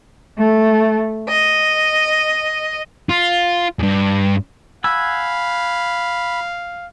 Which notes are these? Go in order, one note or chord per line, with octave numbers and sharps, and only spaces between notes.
A3
D#5
F4
E2 G2
F5 F#5 G#5 B5 E6